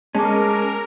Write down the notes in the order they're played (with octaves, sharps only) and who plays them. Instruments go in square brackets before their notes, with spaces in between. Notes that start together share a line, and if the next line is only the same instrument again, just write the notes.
[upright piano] G#3 [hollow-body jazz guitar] C#4 [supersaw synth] A#4 [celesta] A5 D6